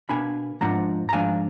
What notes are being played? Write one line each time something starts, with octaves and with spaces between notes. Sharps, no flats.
B2 A#3 D4 G#5 B5
G#2 F3 A#3 D4 F#5 A#5
A#5
G#2 F3 A#3 D4 F5 G#5